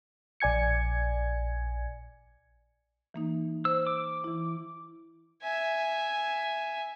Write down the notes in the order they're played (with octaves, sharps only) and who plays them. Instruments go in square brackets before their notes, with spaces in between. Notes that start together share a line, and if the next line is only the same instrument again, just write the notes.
[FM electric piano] A#1 D5 G#5 G#6 C#7
[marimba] E3 A#3 D#4
[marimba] C5 [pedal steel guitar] E6
[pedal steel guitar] D6
[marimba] E3 E4
[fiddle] E5 G#5